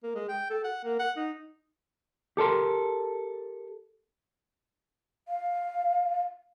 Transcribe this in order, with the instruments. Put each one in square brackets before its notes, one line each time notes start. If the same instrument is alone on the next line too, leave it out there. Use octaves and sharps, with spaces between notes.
[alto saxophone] A#3
G#3
G5
A4
F#5
A#3
F#5
D#4
[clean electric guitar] G4 A4 A#4 C6
[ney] F5